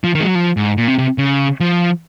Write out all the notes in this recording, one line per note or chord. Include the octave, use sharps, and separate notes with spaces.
F3
D#3
G#3
F#3
F3
G#2
A#2
C3
C3
C#3
F3